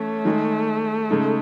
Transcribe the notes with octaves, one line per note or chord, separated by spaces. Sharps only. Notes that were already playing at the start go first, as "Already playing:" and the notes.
Already playing: E3 A3 C#4
D#3 G#3 D#4 G#4
C#3 G#3 D#4 A4